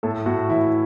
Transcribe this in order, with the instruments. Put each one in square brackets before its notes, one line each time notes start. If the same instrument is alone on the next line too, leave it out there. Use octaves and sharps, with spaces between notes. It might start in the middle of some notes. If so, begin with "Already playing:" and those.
[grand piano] A2 A4
A2 F#4
E3 E4